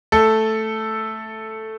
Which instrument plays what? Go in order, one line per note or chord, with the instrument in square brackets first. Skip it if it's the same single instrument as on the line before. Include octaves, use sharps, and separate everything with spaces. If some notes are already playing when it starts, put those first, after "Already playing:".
[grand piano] A3 A4